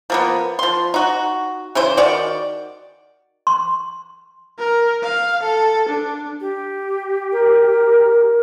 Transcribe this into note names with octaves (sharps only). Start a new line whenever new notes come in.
F3 A#3 B3
F3 C6
D#4 F#4
C#3 E3 C5
D#3 F#4 D5
C6
A#4
F5
A4
D4
G4
A#4